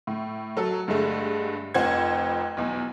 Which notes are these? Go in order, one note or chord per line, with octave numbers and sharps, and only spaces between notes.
A2
F#3 A4
G2 D3 G#3 A3
F1 F2 C5 F#5 G#6
B1 E2